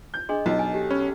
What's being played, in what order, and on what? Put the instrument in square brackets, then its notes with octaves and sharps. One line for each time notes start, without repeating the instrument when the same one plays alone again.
[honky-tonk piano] G6
[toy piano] D4 G#4 C6 [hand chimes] D#5
[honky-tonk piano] B1 [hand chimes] A6
[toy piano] G#5
[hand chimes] G4 A4
[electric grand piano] C#4 [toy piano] B5